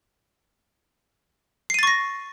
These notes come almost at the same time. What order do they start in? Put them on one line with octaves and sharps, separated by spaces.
C7 D#7 A6 C#6 A#6